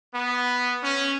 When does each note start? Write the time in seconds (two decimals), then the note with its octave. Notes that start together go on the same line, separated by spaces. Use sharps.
0.13 B3
0.83 C#4